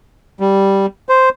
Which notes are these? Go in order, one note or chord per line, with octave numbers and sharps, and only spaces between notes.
G3
C5